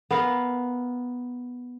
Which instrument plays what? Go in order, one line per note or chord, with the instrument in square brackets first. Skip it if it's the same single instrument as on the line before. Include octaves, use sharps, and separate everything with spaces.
[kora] B3 A#4 F5